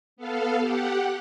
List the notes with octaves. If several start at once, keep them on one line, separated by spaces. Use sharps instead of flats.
B3 A4 F5
G4 F#5